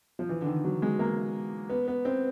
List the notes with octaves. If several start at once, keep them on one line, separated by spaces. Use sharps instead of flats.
F3
E3
D3
D#3
F#3
G#3
A#3
B3
B3
C4